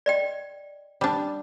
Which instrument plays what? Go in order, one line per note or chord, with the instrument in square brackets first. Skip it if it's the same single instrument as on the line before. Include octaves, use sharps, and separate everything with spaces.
[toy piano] D5 D#5 G5
[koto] G3 D4